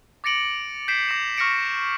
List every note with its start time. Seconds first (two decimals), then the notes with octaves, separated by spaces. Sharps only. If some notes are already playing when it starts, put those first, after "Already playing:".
0.24 D6 A6 A#6 C#7 D7 F#7
0.88 G6 B6 C7 D7 E7
1.09 D6 A#6 E7
1.37 C#6 F6 A#6 B6 C#7 D7